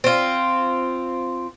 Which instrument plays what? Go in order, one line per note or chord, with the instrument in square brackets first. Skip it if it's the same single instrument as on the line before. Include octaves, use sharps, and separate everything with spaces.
[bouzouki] C4 F4